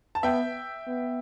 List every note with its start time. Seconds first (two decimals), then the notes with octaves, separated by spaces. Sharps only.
0.15 A5
0.23 B3 E5 G5
0.88 B3